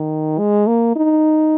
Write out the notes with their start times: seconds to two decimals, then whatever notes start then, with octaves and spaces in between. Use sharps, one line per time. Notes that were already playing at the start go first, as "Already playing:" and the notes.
Already playing: D#3
0.39 G#3
0.67 A#3
0.96 D#4